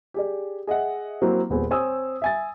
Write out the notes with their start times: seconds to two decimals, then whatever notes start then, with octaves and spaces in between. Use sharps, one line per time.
0.14 G4 G#4 D5
0.67 G#4 D#5 E5 F#5
1.22 F#3 A#3 C4 E4
1.50 D#1 A#2 B3 C4 G#4
1.71 C4 C#5 G#5 D#6 E6
2.22 E5 G#5 A6